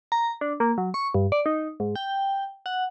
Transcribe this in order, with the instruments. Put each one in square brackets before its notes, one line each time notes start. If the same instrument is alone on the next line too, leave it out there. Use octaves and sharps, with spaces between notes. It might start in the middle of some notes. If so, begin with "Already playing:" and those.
[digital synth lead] A#5
D4
A#3
F#3
C#6
G2
D5
D#4
G#2
G5
F#5